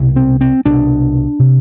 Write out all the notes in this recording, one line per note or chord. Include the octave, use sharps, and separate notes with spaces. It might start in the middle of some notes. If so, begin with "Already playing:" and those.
Already playing: C2 B2
C4
C4
C2 B2 D4
C3